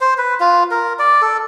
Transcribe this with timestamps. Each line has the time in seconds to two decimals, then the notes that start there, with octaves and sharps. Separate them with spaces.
0.01 C5
0.18 B4
0.40 F4
0.71 A#4
0.99 D5
1.22 A4